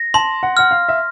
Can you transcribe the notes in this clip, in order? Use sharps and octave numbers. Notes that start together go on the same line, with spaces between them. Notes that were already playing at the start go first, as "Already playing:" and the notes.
Already playing: A#6
A5 C6
F#5
F#5 F6
F5
E5